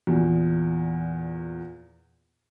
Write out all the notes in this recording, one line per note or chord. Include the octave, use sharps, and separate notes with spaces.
E2 A#2